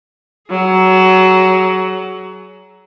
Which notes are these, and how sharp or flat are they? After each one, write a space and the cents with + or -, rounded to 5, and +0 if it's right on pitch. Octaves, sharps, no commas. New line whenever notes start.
F#3 +20 G#4 +25